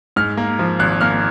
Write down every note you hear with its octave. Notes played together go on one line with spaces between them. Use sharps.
G#2 F6
A#3
F3
G#1 F#6
A#3 F6